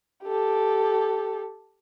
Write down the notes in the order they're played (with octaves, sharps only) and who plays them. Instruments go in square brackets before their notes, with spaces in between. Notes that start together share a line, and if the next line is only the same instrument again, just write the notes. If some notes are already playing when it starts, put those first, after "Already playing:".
[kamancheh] G4 A4